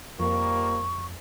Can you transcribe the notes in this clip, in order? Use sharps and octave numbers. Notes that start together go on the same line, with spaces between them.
F2 F3 G3 A#3 C#6